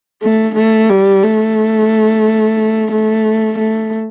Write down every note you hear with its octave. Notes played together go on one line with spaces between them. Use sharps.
A3
A3
G3
A3
A3
A3